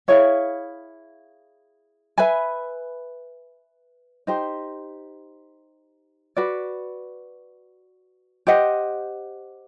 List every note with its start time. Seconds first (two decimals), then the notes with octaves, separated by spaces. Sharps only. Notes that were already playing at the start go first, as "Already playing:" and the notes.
0.08 E4 G#4 C#5 F5
2.18 B4 E5 G#5 B5
4.27 D#4 G4 C5
6.37 F#4 B4 D5
8.47 G4 C5 D#5 F#5